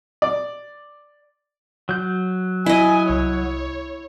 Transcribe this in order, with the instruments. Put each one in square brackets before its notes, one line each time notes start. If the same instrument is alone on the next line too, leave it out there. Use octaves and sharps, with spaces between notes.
[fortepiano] D5
[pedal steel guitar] F#3 G6
[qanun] E4 D#5 [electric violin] G#5
[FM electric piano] C2 [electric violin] C#5